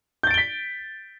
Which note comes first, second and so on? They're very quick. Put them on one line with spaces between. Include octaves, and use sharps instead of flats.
G6 A6 D7 G7 B6